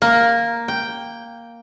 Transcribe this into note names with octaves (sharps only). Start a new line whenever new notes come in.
A#3
G5